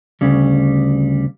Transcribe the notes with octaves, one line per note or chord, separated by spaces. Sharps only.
D2 C#3 G3